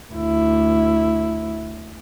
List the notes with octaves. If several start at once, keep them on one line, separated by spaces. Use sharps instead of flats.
D2 E4